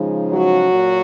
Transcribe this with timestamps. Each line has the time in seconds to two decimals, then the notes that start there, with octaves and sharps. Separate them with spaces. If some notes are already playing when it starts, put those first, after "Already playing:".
Already playing: C#3 F3 G#3 D#4
0.32 F#3 F#4
0.73 A#2